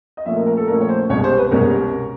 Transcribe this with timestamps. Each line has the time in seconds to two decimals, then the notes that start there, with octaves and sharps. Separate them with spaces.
0.17 D#5
0.26 A#2 F3 A3 C#4 E5
0.36 A#4
0.46 A#4
0.57 A4
0.68 A#2 F3 A3 C#4 A#4
0.81 C#5
0.89 C5
1.10 C2 B2 G#3 C#4 C#5
1.24 C5
1.38 B4
1.51 C2 B2 G#3 C#4 A#4